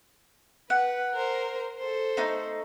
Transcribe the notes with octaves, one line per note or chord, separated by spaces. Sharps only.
B4 F#5
A#4 C5
A4 C5
A3 D#4